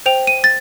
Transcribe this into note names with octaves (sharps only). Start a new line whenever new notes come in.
C5 G5 F7
D#7
A6